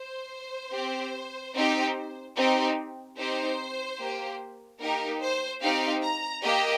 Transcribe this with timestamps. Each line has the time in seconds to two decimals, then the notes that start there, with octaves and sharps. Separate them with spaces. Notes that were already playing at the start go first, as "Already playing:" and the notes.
Already playing: C5
0.73 C4 G4
1.54 C4 D#4 G4
2.36 C4 D#4 G4
3.17 C4 D#4 G4 C5
3.99 A#3 G4
4.81 A#3 D#4 G4 A#4
5.21 C5
5.62 C4 D#4 G4 F5
6.02 A#5
6.43 A#3 G4 D#5